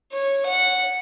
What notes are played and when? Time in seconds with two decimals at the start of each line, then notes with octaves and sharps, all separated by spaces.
0.12 C#5
0.45 F#5